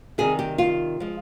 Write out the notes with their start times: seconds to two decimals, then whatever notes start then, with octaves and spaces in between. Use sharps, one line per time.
0.18 C3 D#3 G3 G#4
0.39 G4
0.58 F4
1.00 F3 G#3